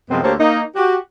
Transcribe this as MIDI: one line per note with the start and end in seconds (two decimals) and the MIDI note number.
0.11 0.21 42
0.11 0.21 48
0.11 0.21 53
0.11 0.21 56
0.11 0.21 59
0.11 0.21 60
0.24 0.34 38
0.24 0.34 58
0.24 0.34 67
0.24 0.34 69
0.24 0.34 72
0.24 0.34 73
0.40 0.62 58
0.40 0.62 63
0.76 0.96 66
0.76 0.96 67